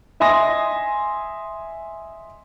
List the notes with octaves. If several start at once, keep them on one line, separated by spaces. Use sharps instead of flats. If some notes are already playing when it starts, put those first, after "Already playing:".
D#5 E5 G#5 C6 D#6 A#6